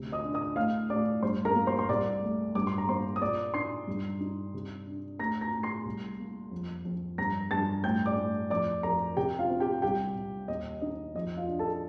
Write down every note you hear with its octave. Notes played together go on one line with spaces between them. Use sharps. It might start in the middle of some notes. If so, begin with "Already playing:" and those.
Already playing: D2 C3
D#5 D#6
D4
D#5 D#6
A2 F5 F6
A2 D5 D6
G2 C5 C6
A#4 A#5
A#3
C5 C6
C6
C2 D5 D6
A3
G2 D6
C6
A#5
A#3 C5 C6
D#6
A#2 D5 D6
D#4 C6 C7
G2
D#4
C3
D4
A2 A#5 A#6
A#5 A#6
A2
C6 C7
C2
A#3
F2
F2
G2 A#5 A#6
G2 A5 A6
A2 G5 G6
D5 D6
A2
F2 D5 D6
F2 A#4 A#5
C3 G4 G5
F4 F5
C4
G4 G5
C2 G4 G5
C2
D#2 D#5
D#4 D#5
F2 D#5
F4 F5
D4
A4 A5